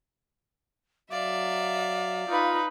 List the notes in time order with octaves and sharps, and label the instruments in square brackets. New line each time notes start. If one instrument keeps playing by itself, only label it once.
[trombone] F#3 [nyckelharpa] D5 [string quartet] E5 [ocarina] F5
[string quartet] D#4 B4 B5 [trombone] F4